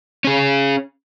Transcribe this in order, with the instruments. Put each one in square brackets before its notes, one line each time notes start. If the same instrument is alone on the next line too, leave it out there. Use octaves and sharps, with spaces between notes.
[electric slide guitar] C#4 G#4